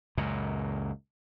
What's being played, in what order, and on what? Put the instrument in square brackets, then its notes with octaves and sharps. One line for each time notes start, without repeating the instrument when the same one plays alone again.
[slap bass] C#2 F#2 A#2